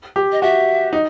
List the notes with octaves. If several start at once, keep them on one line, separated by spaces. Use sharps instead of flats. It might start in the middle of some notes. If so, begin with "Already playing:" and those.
G4
D#5
F#4 E5
D#4